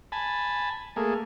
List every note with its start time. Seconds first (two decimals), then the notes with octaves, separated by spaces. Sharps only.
0.12 G#5 A5 B5
0.96 A3 A#3 G#4